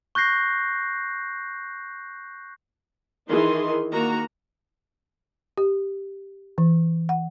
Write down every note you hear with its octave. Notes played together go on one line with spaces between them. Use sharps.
C#6 F#6 G6 A#6 C7
D#3 E3 D#4 G#4 C6
D#3 A#3 F#4 A#5
G4
E3
F#5